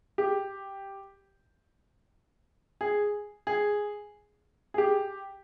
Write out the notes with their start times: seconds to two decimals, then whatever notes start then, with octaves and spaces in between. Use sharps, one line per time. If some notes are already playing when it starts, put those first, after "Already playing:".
0.18 G4
2.81 G#4
3.47 G#4
4.74 G#4
4.78 G4